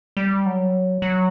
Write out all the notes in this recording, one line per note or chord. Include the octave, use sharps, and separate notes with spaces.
G3
F#3
F#3